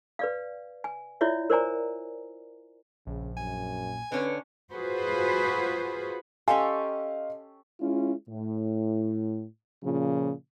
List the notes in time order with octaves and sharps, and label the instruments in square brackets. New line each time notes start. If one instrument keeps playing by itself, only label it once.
[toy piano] B4 D5 F5
G#5
E4 F4 C#5 D5 E5
A#4 C5 D5 G#5 A#5
[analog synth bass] A#1 [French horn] C#3
[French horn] F#2 [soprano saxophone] G#5
[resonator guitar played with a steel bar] D3 C#4 [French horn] B4
[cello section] F4 F#4 G#4 B4 C5
[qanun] C#4 G4 A4 [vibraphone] D#5 [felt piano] F5 C6 [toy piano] G#5
[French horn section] G#3 C#4 E4 F4
A2
A#2 C#3 F3